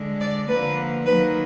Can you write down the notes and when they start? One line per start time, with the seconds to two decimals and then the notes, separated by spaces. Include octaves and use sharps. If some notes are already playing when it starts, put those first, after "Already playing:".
Already playing: D3 G#3
0.20 D5
0.48 D3 F3 A#3 B4
1.06 D#3 F#3 A#3 B4